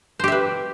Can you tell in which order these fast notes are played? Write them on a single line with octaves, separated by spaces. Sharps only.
C5 G4 E5 B4